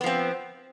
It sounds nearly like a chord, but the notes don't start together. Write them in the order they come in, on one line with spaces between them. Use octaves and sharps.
B3 F3 C4